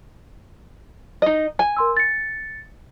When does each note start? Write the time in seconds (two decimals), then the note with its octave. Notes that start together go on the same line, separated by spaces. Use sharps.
1.22 D#4 D#5
1.59 G#5
1.77 A#4 C6 E6
1.97 A6 C#7